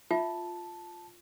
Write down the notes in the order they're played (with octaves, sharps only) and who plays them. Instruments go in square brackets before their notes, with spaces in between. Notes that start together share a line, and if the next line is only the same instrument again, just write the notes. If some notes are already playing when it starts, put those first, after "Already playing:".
[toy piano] F4 [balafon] E5 [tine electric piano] A5